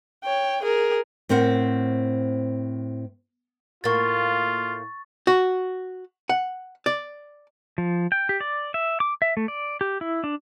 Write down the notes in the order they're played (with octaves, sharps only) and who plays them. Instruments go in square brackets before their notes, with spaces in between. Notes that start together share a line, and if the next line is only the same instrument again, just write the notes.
[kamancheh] C#5 G5
G#4 A#4
[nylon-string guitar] A2 C4 A#4 C5 F#5
[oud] A2 A#3 [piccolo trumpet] F4 [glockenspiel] C#6 A6
[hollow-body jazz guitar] F#4
F#5
D5
[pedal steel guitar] F3
G5
G4
D5
E5
D6
E5
A3
D5
G4
E4
D4